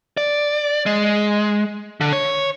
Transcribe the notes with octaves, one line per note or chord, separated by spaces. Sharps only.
D5
G#3
D3
C#5